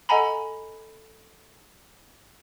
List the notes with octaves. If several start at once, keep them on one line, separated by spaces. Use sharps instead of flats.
A4 D#5 F#5 G#5 A#5 B5